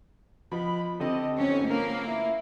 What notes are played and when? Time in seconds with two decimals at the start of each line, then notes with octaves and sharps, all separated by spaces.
0.52 F3 B3 D#5 B5
1.00 D3 C4 G4 A4 D#5
1.39 F2 G#2 C#4
1.69 F3 A#3 B3 A#4
2.06 E4